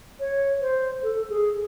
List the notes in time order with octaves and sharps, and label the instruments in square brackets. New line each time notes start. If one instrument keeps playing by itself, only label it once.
[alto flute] C#5
C5
A4
G#4